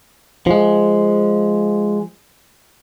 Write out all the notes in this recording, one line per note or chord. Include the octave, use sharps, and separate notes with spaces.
F3 G#3